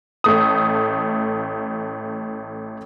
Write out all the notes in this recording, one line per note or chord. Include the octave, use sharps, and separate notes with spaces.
A1 A3 D#6